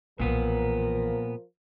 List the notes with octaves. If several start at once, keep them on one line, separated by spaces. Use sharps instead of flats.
B1 A#2 E3 F3 B3 A#4